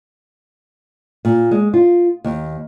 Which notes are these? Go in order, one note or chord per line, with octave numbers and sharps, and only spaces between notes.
A#2
G#3
F4
D#2